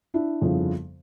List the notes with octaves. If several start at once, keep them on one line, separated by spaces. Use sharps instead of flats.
D4 E4
G1 F2 C#3 F3